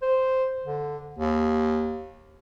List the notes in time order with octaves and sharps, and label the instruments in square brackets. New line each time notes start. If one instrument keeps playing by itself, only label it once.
[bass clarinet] C5
D3
D#2